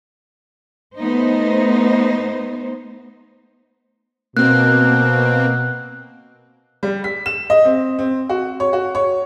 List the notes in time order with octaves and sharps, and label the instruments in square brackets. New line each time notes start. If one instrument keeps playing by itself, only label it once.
[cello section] A3 B3 D#4 C5
[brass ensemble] B2 [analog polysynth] A#3 C4 [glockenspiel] F#6
[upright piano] G3
B6
E7
D#5
C4
C4
F#4
C#5
F#4
C#5